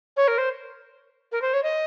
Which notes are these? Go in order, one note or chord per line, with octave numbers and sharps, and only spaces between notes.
C#5
A#4
C5
A#4
C5
C#5
D#5